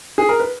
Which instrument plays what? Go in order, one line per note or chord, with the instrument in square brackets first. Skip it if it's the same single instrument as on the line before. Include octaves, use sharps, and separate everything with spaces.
[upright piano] G#4
A#4
B4